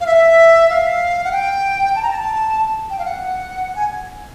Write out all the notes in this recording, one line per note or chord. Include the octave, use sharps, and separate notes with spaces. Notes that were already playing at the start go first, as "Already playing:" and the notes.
F5
E5
F5
F#5
G5
A5
A#5
A5
G5
F5
F#5
G#5